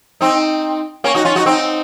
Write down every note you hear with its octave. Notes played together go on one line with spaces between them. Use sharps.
C4 D#4
A#3 C#4
D#4 F#4
C#4 F4
D#4 F#4
C4 D#4